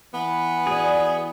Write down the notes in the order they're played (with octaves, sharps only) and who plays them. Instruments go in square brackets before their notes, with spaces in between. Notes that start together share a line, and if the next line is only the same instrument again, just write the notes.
[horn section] E3 B3
[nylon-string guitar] F#4 D5 [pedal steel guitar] G#4